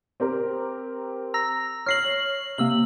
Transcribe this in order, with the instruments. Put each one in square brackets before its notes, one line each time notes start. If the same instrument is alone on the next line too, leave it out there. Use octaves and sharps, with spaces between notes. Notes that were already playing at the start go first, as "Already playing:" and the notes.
[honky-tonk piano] C4 G4 A#4
[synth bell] A#5 E6 A#6
[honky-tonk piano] C#5 A#6 [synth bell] F6 C7 F#7
[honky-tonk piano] C3 [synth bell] A#3 E6 F#7